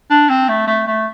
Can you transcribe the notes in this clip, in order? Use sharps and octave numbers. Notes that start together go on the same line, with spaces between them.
D4
C4
A3
A3
A3